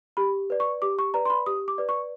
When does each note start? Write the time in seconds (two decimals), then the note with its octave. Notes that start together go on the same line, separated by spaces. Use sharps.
0.17 G4 B5
0.50 B4 D5
0.60 C#6
0.82 G4 D6
0.99 C#6
1.14 B4 D5 A#5
1.25 C6
1.30 B5
1.46 G4 D#6
1.68 D6
1.78 B4 D5
1.89 C#6